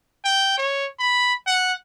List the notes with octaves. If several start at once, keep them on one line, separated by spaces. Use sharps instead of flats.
G5
C#5
B5
F#5